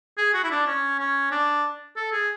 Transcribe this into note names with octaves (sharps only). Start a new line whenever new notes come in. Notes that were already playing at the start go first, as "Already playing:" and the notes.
G#4
F#4
E4
D4
C#4
C#4
D4
A4
G#4